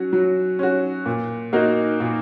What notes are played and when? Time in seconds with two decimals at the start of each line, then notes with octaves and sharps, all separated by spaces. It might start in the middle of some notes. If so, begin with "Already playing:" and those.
Already playing: F#3 C#4 F#4
0.13 F#3
0.59 C#4 F#4
1.06 A#2
1.53 A#3 D#4 F#4
2.00 A#2